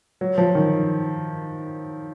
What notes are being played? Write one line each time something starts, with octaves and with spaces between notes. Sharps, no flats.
F#3
F3
D#3